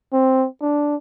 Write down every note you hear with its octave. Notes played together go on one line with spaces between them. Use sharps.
C4
D4